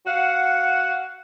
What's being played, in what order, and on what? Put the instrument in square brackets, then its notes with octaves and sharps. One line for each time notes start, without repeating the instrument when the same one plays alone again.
[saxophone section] F#4 F5 F#5